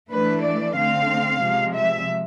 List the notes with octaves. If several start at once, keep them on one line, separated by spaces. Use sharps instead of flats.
E3 A3 D4 B4
D5
D3 A3 C4 F5
C3 F3 G#3
E5